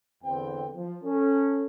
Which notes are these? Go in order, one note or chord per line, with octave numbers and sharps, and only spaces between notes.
E2 D3 C4 B4 G5
F3
C#4 A4